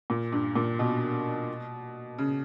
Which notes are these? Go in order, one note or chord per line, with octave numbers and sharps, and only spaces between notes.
A#2
G2
A#2
B2
C#3